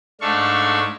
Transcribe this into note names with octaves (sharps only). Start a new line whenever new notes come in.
G#2 A3 D4 A4 F5 C#6